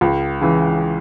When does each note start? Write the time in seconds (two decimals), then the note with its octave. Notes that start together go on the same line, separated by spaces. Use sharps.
0.01 C#2
0.41 C#3 E3